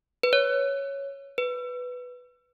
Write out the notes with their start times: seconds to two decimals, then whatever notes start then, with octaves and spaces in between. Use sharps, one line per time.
0.23 B4
0.33 C#5
1.38 B4